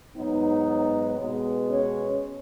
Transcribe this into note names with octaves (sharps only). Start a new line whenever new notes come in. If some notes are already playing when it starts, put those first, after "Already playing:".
G#2 F#3 B3 D#4
B2 G#3 B3
C#4 C#5